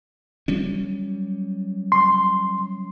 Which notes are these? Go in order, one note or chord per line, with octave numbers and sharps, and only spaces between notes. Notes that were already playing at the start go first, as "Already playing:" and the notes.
F#3 G3 C#4
C6